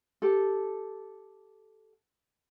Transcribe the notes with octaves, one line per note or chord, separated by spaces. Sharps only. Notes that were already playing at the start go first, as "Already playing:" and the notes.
G4 A4